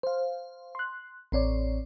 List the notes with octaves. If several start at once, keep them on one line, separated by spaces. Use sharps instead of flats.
C5 F5
C6 F#6
A1 C4 C#5 D5